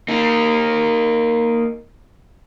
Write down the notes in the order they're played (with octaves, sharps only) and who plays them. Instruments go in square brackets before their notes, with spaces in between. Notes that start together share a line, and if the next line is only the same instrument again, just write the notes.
[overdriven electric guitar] A#3 D#4